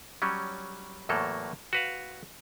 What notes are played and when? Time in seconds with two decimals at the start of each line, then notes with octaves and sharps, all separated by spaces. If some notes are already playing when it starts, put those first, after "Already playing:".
0.22 F#3 G3 C#4
1.09 E2 A2 F#3 A#3 A4
1.73 F#4 B4 F5